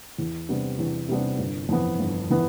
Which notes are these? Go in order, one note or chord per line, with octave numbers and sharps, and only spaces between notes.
E2
C3 G3 B3 D4
E2
C3 G3 B3 D4
G1
F2 E3 B3
G1
E3 B3